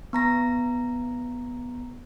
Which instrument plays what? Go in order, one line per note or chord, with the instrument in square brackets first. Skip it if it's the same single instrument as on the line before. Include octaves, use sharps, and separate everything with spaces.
[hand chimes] B3 A#5 A#6